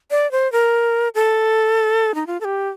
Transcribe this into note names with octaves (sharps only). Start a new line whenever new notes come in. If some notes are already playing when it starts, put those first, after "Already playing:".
D5
C5
A#4
A4
D#4
F4
A4
G4